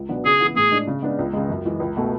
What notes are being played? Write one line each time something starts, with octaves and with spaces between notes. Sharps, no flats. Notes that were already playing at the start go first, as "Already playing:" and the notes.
Already playing: C#2
B2 F#3 B3 D4
C#3 G#4
E3 B3
A2 G#4
G#3 D4
C#3
G#3 B3 D4
C#2
C#3 G#3
F#2
E3 G#3
C#2
B2 A3